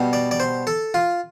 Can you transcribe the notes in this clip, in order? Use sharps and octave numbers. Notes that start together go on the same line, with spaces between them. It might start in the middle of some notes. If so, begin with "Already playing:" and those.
Already playing: B2 G3
D5
D5
C5
A4
F4